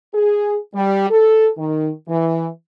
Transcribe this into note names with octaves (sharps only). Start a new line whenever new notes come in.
G#4
G3
A4
D#3
E3